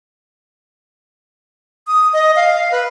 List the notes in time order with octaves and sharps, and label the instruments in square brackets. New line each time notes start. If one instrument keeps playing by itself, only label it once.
[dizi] D#6
D#5
F5
B4